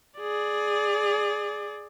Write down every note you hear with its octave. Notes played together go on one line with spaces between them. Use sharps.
G#4 D5